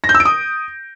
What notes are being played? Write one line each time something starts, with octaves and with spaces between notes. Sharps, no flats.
A#6
G6
E6
D7
D#6